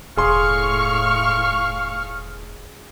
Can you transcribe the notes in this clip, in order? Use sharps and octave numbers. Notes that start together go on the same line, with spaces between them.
E1 A2 G#4 F5 C6 C#6 F6